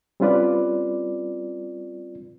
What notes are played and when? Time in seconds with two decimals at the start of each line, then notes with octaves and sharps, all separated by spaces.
0.20 G3 C4 C#4 F4 B4 D5